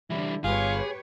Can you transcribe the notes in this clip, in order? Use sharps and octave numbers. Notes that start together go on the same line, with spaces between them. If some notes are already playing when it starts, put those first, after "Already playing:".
D3 E3 G3 E4
G1 F4 G4 G#4 B4 C#5